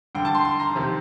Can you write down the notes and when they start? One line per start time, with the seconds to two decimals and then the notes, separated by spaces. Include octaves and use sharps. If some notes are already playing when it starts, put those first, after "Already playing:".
0.15 G2 D3 G5
0.25 A5
0.35 C6
0.45 C6
0.60 A#5
0.75 F2 C3 D#3